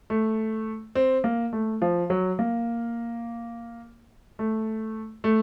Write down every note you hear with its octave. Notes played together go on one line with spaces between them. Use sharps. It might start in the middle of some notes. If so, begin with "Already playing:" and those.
A3
C4
A#3
A3
F3
F#3
A#3
A3
A3